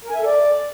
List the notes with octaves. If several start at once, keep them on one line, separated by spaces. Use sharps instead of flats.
A#4
G#5
E5
A4
D5